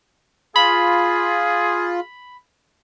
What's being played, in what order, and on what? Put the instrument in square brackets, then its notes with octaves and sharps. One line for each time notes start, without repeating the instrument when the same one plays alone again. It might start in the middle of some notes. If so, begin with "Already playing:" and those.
[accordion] F4 [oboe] G#4 [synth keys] B5